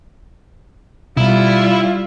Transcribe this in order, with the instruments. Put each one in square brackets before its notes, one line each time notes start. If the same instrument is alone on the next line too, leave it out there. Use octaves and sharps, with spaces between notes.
[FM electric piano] B2 [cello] G3 F4 [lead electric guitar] E4